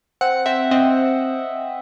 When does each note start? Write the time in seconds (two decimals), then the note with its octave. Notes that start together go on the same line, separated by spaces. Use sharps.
0.21 C4 F#5
0.46 C4 E5
0.71 C4 D#5